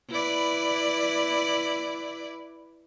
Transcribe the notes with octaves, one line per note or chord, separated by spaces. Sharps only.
E4 B4 D5